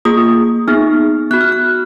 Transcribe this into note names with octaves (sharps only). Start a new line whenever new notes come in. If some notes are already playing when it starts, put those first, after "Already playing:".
A#3 F4 G#4 D#6
B3 D#4 G#4 F6
B3 F#4 F#6
F6
F#6